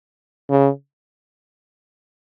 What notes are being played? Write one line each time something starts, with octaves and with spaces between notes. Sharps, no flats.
C#3